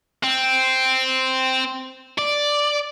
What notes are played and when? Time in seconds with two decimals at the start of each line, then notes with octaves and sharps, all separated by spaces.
0.24 C4
2.18 D5